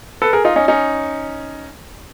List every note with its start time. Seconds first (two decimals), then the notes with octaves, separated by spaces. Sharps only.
0.22 A4 B4
0.33 G#4 A#4
0.45 D#4 F4
0.56 C#4 D#4
0.68 C#4 D#4